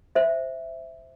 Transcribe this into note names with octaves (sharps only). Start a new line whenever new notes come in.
C5 E5